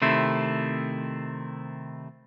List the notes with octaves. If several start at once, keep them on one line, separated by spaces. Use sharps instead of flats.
C3 D#3 A3 C4 E4